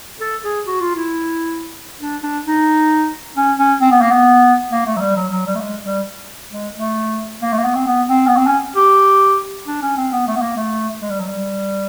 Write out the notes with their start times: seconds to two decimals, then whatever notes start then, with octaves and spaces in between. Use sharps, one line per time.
0.21 A4
0.44 G#4
0.67 F#4
0.81 F4
0.96 E4
2.01 D4
2.23 D4
2.46 D#4
3.37 C#4
3.59 C#4
3.81 C4
3.91 B3
4.01 A#3
4.12 B3
4.72 A#3
4.87 A3
4.96 F#3
5.01 G3
5.16 F#3
5.32 F#3
5.47 G3
5.55 A3
5.61 G#3
5.85 G3
6.52 G#3
6.75 A3
7.42 A#3
7.53 A3
7.58 A#3
7.64 B3
7.75 C4
7.87 B3
8.09 C4
8.27 B3
8.37 C4
8.47 C#4
8.76 G4
9.67 D4
9.82 C#4
9.97 C4
10.12 B3
10.27 A3
10.36 B3
10.41 A#3
10.56 A3
11.02 G#3
11.10 G3
11.20 F#3
11.28 G3